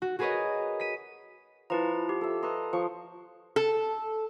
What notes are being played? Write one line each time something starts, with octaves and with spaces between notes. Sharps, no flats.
F#4
F#4 G#4 A#4 B4 C#5 D#5
B6 D#7
F3 E4 B4 A#5
G4
A4 E5
B4 D#5 A#5 C6
F3 C#6
A4